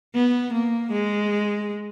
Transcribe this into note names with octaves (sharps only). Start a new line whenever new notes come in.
B3
A#3
G#3